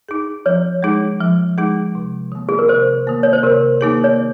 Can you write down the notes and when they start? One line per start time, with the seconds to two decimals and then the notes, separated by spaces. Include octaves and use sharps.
0.09 D#4 G#4
0.46 F3 C#5
0.83 G#3 D#4 G#4
1.21 F3
1.58 G#3 D#4 G#4
1.95 C3
2.32 D#3 A#3
2.49 G#4
2.59 A#4
2.69 C3 C5
3.07 D#3 A#3
3.23 C#5
3.33 C5
3.43 C3 A#4
3.81 D#3 A#3 D#4 G#4
4.04 C#5